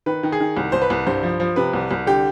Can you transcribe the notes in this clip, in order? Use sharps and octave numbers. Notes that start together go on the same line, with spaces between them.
D#3 B4
D#3
G#4
D#3
C2
C2 C5
B4
C2
G2 C5
F3
F3
C3 B4
C2
C2
D3 G4